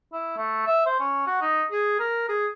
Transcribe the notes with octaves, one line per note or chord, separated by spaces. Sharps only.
E4
A3
E5
C5
C#4
F#4
D#4
G#4
A#4
G#4